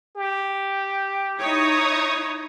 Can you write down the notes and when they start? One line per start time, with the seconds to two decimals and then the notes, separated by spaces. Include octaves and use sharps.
0.16 G4
1.39 D#4 E4 C#5 C#6 D#6